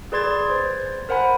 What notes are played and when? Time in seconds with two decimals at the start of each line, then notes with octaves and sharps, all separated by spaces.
0.12 G#4 B4 D5 C6 G#6 A6
0.50 C5
1.09 A#4 C5 F#5 G#5 B5